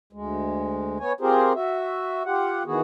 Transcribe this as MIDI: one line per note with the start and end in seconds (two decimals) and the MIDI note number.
0.13 0.98 38
0.13 0.98 56
1.00 1.13 59
1.00 1.13 73
1.00 1.13 80
1.21 1.53 60
1.21 1.53 65
1.21 1.53 67
1.21 1.53 68
1.21 1.53 70
1.21 1.53 72
1.55 2.23 66
1.55 2.23 76
2.26 2.63 65
2.26 2.63 67
2.26 2.63 78
2.66 2.81 51
2.66 2.81 52
2.66 2.81 59
2.66 2.81 66
2.66 2.81 68